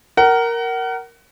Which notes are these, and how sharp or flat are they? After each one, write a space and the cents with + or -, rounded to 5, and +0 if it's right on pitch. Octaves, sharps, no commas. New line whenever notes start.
A#4 +0 F#5 +30